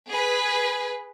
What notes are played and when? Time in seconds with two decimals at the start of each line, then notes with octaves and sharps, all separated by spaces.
0.11 G#4 B4